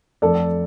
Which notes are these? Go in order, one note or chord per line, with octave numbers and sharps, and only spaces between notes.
F2 F3 A3 A4 D5